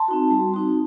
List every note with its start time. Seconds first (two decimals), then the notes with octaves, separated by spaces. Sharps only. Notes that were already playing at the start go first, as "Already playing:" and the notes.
Already playing: A5 C6
0.08 C4 D#4 F#4
0.31 G3
0.54 C4 D#4 F#4